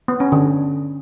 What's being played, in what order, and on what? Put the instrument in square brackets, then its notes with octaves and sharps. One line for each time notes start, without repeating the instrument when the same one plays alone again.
[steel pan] B3
C#4
D3